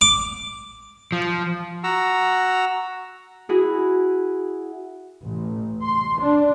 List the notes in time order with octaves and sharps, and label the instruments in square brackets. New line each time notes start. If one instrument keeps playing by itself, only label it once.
[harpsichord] D6
[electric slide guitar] F3
[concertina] F#4 F#5 A#5 E6
[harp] E4 F#4 G#4
[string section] A1
C6
D4